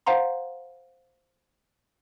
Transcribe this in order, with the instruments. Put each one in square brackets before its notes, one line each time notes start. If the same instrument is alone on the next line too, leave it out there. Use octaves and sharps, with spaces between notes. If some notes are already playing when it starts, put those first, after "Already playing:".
[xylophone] C5 F5 F#5 A#5 C6